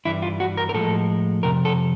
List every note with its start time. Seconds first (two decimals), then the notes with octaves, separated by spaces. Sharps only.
0.05 G2 E3 G3 E4
0.22 F4
0.40 F#4
0.57 A#4
0.69 A#4
0.74 A2 F3 G#3 A4
1.43 F2 C3 A#4
1.65 A4